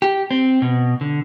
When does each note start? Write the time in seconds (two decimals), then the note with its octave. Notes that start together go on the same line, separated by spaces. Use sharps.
0.02 G4
0.31 C4
0.62 B2
1.01 D3